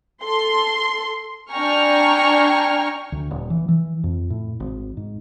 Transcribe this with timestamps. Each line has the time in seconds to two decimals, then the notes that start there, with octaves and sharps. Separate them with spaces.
0.22 A4 C6
1.50 D4 G5 G#5 A#5 C#6 F6
3.12 D2
3.31 D#1
3.50 E3
3.69 E3
4.04 F2
4.30 A2
4.60 G#1
4.97 G#2